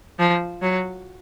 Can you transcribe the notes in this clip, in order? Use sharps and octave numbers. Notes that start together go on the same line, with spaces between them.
F3
F#3